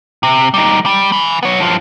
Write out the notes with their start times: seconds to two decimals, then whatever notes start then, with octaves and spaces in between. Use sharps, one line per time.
0.23 C3
0.54 G3 D#4
0.86 G3
1.12 G#5 B5
1.43 B3 C#5
1.60 G2 F3